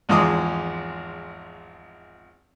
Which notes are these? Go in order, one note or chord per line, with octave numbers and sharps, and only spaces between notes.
G#1 E2 F3 G#3 D6 D#6